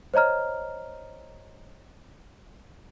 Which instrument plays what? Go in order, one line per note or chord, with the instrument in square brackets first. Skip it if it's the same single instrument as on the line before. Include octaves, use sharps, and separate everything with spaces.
[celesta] C5 C#5 D#5 A#5 F6